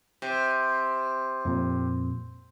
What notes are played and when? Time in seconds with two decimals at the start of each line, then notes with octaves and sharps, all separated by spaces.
0.22 C3
1.45 F2 A#2